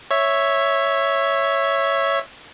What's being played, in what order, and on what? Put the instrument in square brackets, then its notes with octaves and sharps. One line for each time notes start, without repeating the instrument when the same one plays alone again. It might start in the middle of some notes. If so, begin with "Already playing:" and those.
[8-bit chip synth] C#5 E5